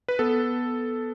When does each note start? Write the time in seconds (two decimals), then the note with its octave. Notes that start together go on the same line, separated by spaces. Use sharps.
0.08 B4
0.19 B3 A4